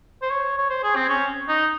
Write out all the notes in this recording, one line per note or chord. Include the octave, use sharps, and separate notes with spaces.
C5
C#5
C#5
C5
G#4
C4
C#4
D#4